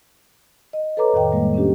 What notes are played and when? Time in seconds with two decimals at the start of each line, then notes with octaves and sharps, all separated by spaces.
0.73 D#5
0.97 A4 B4 C#5 A#5 D6
1.13 F2 A2 D#3 D#5 F5 G5
1.32 A2 G3 G#3 A#3
1.54 C#4 D4 G4